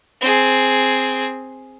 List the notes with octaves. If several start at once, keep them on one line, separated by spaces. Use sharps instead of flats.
C4 G#4